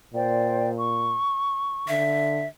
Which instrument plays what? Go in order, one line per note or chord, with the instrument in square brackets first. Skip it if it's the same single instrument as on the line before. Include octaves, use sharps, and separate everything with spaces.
[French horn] A#2 [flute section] C5 D5 G5
[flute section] C#6
[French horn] D3 [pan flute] E5